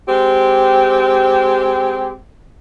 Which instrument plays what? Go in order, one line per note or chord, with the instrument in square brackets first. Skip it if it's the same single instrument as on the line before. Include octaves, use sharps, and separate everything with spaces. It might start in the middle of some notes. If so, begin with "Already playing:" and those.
[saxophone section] G#3 C4 G4